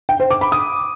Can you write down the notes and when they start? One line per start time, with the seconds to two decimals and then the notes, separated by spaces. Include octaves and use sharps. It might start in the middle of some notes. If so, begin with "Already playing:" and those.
0.09 G5
0.20 C5
0.30 D6
0.41 B5
0.52 D#6